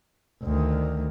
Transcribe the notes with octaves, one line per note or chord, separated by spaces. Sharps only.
D2 D#3